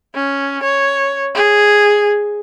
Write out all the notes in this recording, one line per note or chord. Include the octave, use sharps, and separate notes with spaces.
C#4
C#5
G#4